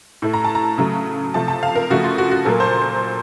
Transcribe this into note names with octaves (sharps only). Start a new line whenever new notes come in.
A2 A3
A#5
A5
A#5
C#3 F#3 A3
C3 F3 A3 A5
A5
F5
A#4
C#3 F3 A3 F#4
F4
F#4
F#4
A#2 F#3 A#3 A4
C5